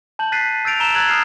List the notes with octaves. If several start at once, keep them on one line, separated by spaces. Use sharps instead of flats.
A5 G6 F#7
F#6 A6 B6 C7 D#7
E6 G6 A6 D7 F7
A#5 E6 E7 F7 G7
E6 F#6 G#6 A6 F#7
D#6 F6 C7 E7